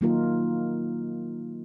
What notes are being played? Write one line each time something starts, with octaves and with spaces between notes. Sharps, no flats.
D#3 F#3 A#3 D#4 F4 A#4